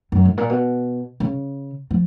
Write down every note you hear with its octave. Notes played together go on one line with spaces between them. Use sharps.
F#2
G#2
A#2
B2
C#3
F3